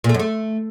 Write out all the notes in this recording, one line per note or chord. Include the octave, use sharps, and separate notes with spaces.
A#2
A3
F#2
A3